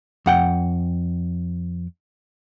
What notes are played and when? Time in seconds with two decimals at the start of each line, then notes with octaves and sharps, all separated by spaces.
0.26 F2 F#5 G5